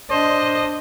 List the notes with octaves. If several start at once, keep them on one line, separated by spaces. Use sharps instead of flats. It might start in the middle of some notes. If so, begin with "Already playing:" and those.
D4 C5 D#5